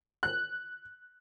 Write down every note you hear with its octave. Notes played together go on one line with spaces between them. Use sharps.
F#6